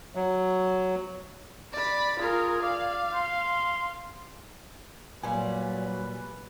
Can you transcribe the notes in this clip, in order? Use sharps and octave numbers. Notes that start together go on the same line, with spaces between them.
F#3
D5 B5
F4 G#4 A#4
D5 F5
C6
A#2 F#3 G3 B4 G#5